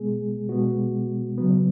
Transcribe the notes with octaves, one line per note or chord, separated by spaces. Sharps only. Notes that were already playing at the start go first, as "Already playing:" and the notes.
Already playing: B2 G#3 B3 G#4
B2 G#3 B3 F#4
C#3 F#3 B3